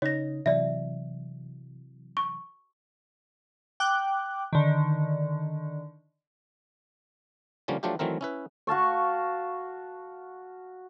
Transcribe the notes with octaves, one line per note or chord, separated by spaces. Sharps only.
C#3 D#4 C#5 D#5 A#6
C3 E3 F#3 D5 E5
C#6
G5 D6 F#6
D3 D#3
D3 F3 G3 A#3 C#4 F4
F3 F#3 A3 D4 F4 G4
D#3 E3 F#3 A3 C4 A#4
C#4 E4 B4
F#4 F5 A5 C#6